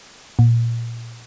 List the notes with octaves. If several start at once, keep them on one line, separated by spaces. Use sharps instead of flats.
A#2